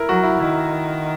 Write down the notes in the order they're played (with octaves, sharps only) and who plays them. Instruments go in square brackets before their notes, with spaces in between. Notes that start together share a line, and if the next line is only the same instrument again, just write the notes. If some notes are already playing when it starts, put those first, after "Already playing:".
Already playing: [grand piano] E4 A#4
[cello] F#3 [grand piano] F#4
[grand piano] E4
[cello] D#3 [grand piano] E4